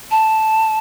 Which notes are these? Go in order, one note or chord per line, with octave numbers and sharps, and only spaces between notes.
A5